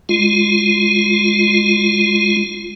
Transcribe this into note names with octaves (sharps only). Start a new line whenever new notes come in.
G#3 F4